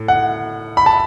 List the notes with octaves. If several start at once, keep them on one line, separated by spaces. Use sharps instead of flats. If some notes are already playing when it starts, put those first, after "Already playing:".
Already playing: A2
F#5
B5
A5